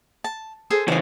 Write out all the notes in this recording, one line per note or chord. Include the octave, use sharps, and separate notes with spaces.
A5
G#4 A4 C5
C#3 E3 C#4 G#4 C5